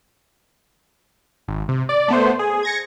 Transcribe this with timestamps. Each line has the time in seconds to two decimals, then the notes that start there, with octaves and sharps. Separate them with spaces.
1.48 G#1
1.68 C3
1.89 D5
2.08 A3 B3 C5
2.39 G#4
2.63 G#6 A#6 C#7